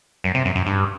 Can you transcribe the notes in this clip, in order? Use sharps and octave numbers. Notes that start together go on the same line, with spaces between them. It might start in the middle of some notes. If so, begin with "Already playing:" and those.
F#2
C3
F#2
F#2
G2